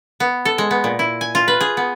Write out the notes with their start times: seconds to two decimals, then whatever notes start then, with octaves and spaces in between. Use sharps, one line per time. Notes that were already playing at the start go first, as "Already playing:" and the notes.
0.20 B3
0.45 A4
0.58 G#3
0.71 B3
0.84 A#2
0.99 E4
1.21 G#5
1.35 F4
1.48 B4
1.61 G#4
1.77 B3